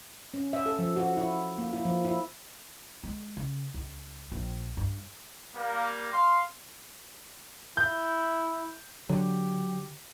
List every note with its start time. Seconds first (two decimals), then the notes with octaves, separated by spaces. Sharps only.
0.34 C#4
0.53 E5
0.66 A4
0.79 F3
0.96 F#4
1.17 E4
1.58 A#3
1.73 E4
1.85 F3
2.05 E4
3.04 G#3
3.37 C#3
3.74 C#2
4.32 A#1
4.77 G2
5.56 G3 A#3
6.13 F5 C6
7.77 E4 G6
9.09 D3 F#3 G4